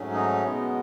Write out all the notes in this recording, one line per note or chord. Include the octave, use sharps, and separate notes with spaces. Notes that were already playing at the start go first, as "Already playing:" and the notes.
Already playing: G#2 F#3 A3 C#4
D#4
B2 G#3 B3